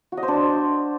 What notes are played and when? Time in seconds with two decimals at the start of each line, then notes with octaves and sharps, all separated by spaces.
0.12 F#4
0.17 D#5
0.23 C5
0.28 D4